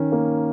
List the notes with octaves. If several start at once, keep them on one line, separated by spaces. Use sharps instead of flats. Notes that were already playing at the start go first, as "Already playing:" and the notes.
Already playing: D#3 C#4
A#3